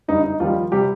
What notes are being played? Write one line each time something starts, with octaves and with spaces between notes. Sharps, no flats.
G1 G2 G3 D#4
D#4
D#2 D#3 F3 G3 F4
C3 G3 G4